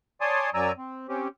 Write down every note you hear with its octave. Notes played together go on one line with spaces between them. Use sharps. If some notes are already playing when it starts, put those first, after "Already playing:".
C#5 D5 G#5 A5 C6 D#6
F#2 F#3 D5 G#5 A#5 E6
C4
C4 C#4 G4